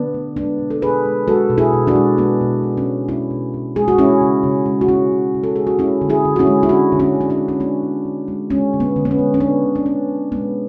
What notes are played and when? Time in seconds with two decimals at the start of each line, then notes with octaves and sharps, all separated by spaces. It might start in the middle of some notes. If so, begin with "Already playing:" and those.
Already playing: D3 B3 D4
0.14 A3
0.37 G#3 B3 D4
0.59 B2
0.70 A4
0.82 B2 G#4 B4
1.05 G#3
1.27 G#3 F#4 A4
1.50 B2
1.58 E4 G#4
1.73 B2
1.87 D4 F#4
1.95 G#3
2.18 G#3 B3
2.41 B2
2.63 B2
2.78 C#4
2.85 G#3
3.09 G#3 C#4 E4
3.31 B2
3.54 B2
3.76 G#3 G#4
3.88 F#4
3.98 G#3 C#4 E4
4.21 C#3
4.43 C#3
4.66 G#3
4.81 F#4
4.88 G#3 C#4 E4
5.12 C#3
5.35 C#3
5.44 A4
5.56 G#3 G#4
5.67 F#4
5.79 G#3 C#4 E4
6.01 D3
6.09 E4 G#4
6.25 D3
6.36 F#4
6.39 C#4 E4
6.47 G#3
6.63 E4
6.69 G#3 D4 F#4
6.92 D3
7.00 C#4 E4
7.15 D3
7.21 D4
7.30 C#4 E4
7.37 G#3
7.48 C#4
7.60 G#3 B3 D4
7.83 D3
8.05 D3
8.28 G#3
8.50 G#3 C#4
8.73 D3
8.80 B3
8.96 D3
9.05 B3
9.11 C#4
9.19 G#3
9.34 C#4
9.40 G#3 B3 D4
9.64 D3
9.75 D4
9.86 D3 C#4
10.08 G#3
10.32 G#3 B3